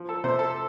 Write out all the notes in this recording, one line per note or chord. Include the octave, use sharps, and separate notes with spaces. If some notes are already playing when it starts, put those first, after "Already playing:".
Already playing: F3
A4
C3 C5
A4